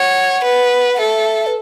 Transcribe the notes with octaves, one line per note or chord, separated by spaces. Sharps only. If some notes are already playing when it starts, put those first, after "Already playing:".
Already playing: C#5 F#5
B4
F#5
A4 E5
B4